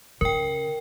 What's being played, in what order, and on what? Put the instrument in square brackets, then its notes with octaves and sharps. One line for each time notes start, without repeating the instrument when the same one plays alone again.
[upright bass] C#3 [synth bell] A#4 G5